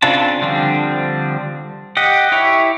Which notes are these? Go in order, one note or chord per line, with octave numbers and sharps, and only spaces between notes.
C#3 C4 D4 F4 A5
D3 F3 G3 C4 D4
G4 D#5 F#5
E4 G4 C#5